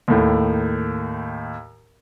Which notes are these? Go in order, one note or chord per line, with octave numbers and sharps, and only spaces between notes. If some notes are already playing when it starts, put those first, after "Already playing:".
D#2 A2